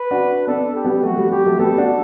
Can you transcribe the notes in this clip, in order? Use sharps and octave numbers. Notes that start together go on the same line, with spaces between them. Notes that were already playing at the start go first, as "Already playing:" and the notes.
Already playing: B4
D4 F#4
B3 D4 A4
G4
G3 B3
F#3 A3 F#4
G3
G3 G4
F#3 A3
G3 B3 A4
D4 F#4